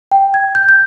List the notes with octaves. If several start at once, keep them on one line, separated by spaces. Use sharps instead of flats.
G5
G#6
G6
G6